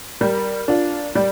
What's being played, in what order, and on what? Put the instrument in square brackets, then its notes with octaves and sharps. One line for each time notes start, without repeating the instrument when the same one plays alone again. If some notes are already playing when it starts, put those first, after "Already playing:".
[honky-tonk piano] G3 [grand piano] A#4
[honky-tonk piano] D4 F4
[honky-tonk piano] G3 [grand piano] D5